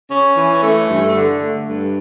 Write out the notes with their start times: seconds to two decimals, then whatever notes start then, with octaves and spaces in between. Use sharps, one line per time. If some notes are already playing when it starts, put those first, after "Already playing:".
0.11 C#4
0.37 E3
0.63 A3
0.89 G2
1.16 D3
1.42 A3
1.67 G2